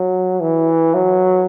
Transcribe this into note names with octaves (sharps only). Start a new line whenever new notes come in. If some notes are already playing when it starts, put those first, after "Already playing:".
Already playing: F#3
E3
F#3